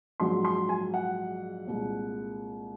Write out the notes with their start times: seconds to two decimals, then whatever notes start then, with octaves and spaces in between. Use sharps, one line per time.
0.20 A#1 G#2 F#3 C6
0.45 C6
0.69 G#5
0.94 F#5
1.67 C2 A#2 G#3